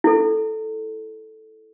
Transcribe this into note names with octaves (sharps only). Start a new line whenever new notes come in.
E4 A4